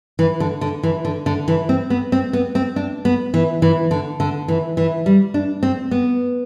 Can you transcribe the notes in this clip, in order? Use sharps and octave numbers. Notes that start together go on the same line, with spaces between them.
E3
D3
D3
E3
D3
D3
E3
C4
B3
C4
B3
C4
D4
B3
E3
E3
D3
D3
E3
E3
G3
D4
C4
B3